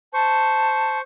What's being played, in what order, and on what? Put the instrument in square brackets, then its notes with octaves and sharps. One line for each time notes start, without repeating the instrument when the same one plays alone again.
[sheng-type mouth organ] C5 C#6 [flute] A5